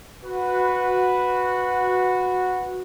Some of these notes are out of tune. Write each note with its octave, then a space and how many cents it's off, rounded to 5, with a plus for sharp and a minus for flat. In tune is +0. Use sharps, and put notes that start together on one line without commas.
F#4 -10 B4 +0